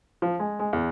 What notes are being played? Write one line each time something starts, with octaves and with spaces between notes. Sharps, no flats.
F3
G#3
G#3
E2